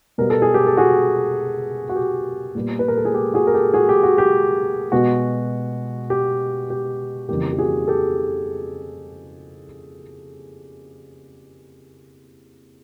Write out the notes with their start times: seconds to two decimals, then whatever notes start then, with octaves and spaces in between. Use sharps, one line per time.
0.18 B2 G3 B3 A#4
0.30 A4
0.42 G#4
0.54 G4 A4
0.67 A4
0.77 F#4 G#4
1.89 F#4
1.96 G4
2.55 A#2 G3 B3
2.79 B4
2.88 A#4
2.97 A4
3.05 G#4
3.14 G4
3.34 F#4 G#4
3.47 A#4
3.54 G4 A4
3.74 F#4 G#4
3.89 G4
4.03 F#4
4.18 G4
4.92 B2 G#3 B3 F#4
6.10 G4
6.70 G4
7.29 F2 C#3 E3 G3 A#3 G4
7.53 G4
7.59 F#4 G#4
7.88 G4 A4